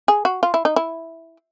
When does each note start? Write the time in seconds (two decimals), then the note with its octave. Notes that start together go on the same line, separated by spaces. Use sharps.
0.08 G#4
0.25 F#4
0.43 F4
0.54 E4
0.65 D#4
0.76 E4